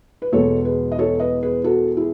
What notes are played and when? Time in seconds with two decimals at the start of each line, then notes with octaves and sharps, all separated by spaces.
0.22 B4
0.32 E2 B2 G#3 A4 C#5
0.65 G#4 B4
0.92 D#5
0.99 A4 C#5
1.20 B4 D#5
1.43 G#4 B4
1.64 F#4 A4
1.97 E4 G#4